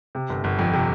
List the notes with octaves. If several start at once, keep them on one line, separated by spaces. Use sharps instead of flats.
C3
G1
G1
F2
C3